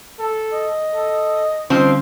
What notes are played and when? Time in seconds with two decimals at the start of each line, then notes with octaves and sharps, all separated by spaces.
0.19 A4
0.53 D#5
0.94 A4
1.70 D3 F3 G3 C4 C#4 D#4 F4